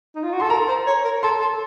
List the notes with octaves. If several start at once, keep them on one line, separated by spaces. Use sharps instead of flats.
D#4
F4
F#4
A4 C6
A#4 A#5
C5
C#5
A#4
A4 C6
A4